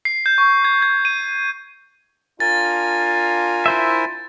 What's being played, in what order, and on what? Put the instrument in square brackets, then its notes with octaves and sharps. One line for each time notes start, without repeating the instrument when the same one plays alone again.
[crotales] C7
G6
C#6
G#6
G#6
D#7
[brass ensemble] D4 F4 [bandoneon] A#4 G#5 [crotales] A6
[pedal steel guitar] E4 C5 E5